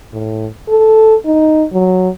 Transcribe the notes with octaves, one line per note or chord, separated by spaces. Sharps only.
A2
A4
D#4
F#3